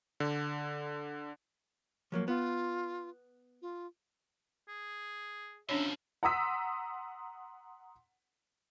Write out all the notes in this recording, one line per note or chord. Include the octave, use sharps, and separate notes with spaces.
D3
F3 F#3 A#3
B3 F4
F4
G#4
B2 F3 C#4 D4 C#5 E5
F#5 A#5 C6 D#6 E6 B6